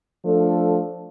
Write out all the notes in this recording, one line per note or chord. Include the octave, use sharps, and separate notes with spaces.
F3 A3 D4 A4